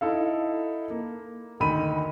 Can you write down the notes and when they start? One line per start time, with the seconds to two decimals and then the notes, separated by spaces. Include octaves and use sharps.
0.01 D#4 E4 A4 F5
0.90 A#3
1.60 D2 D#3 B5 D#7